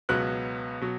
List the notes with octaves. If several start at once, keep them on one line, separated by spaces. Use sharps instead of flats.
C#2 B2 F#3 B3 F#6
B2 F#3